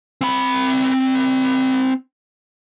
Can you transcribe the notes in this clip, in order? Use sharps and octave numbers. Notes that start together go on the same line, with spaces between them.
C4 B5